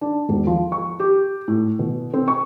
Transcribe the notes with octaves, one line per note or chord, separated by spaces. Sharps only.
D4
E1
F3
C#6
G4
A2
B2
C4
C#6